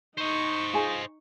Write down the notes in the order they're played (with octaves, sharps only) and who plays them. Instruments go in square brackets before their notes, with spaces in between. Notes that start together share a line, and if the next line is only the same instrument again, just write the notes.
[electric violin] D#4 C#6 [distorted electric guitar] C5 D#5
[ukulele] F4 G#4 G#5